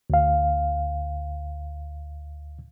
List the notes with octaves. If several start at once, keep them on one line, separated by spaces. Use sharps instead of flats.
D2 F5